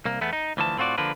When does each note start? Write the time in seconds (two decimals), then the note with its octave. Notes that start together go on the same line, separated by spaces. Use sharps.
0.05 C2 A#3
0.21 E2 A3 B3
0.33 D#4
0.57 D2 E3 F3 A5
0.78 A2 C4 F4 F#4 D5
0.98 D3 F3 A#3 D4 B4